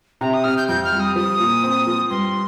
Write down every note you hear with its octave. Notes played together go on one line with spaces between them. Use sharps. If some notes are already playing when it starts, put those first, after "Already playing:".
C3 A#5
D#6
C3 F6
G6
F2 G6
F6
G3
D#6
F3 D#6
A#2
C4
F3
G2 C6